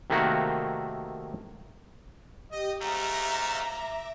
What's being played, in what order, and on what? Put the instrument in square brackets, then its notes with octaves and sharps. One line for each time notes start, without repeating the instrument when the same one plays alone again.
[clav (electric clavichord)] C3 D#3 A3 A#3 F#4
[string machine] G4 [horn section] D#5
[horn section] G#2 C#4 F5 [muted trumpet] A3 [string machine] E5 D6 A#6 [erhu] A#5